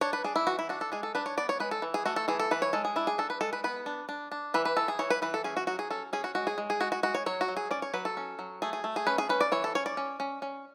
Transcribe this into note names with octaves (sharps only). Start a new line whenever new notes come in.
D4 C#5
B4
D4 G#4
E4
E3 F#4
E4
D4 F#4
A4
G#3 G#4
A4
D4 B4
C#5
B3 D5
C#5
G#3 B4
A4
E3
G#4
A3 F#4
A4
E3 G#4
A4
E3 B4
C#5
G#3 A4
G#4
D4 E4
G#4
D4 A4
B4
G#3 A4
B4
B3 B4
D4
D4
D4
E3 B4
B4
E3 A4
G#4
E3 C#5
B4
E3 B4
A4
C#4 G#4
F#4
F#3 F#4
G#4
C#4 A4
C#4 G#4
F#4
G#3 F#4
G#4
G#3
G#4
G#3 F#4
F#4
G#3 F#4
C#5
F#3 C#5
F#4
F#3
G#4
C#4 D5
C#5
F#3 B4
A4
C#4
F#3
A3 G#4
G#4
A3
G#4
C#4 B4
G#4
C#4 B4
D5
E3 C#5
A4
C#4 C#5
D5
C#4
C#4
C#4